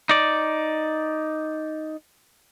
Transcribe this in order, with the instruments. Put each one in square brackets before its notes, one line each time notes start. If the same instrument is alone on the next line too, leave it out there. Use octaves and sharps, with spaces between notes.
[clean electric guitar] D#4 D5